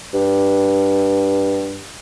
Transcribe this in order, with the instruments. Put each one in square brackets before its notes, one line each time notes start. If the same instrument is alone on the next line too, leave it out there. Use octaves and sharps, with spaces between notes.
[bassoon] G2